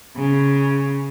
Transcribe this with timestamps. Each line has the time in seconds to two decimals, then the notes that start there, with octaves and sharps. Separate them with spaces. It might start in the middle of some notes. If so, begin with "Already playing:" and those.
0.16 C#3